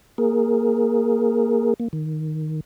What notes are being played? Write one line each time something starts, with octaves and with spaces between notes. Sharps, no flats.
A#3 G#4 A#4
A#3
D#3